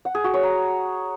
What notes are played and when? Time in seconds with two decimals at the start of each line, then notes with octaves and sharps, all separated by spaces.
0.05 F#5
0.15 G#4
0.24 F#4
0.34 C#5
0.43 A#5